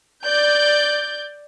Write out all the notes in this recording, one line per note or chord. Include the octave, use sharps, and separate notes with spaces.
D5 G6